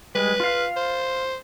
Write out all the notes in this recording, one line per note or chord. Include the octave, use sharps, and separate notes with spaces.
G3 G#3 B4
F4 F5
C5